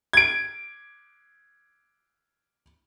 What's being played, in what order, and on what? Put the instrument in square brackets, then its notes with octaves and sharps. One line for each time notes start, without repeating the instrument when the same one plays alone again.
[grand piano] G#6 D7